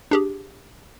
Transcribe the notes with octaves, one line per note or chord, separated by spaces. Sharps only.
D4 G4 G#4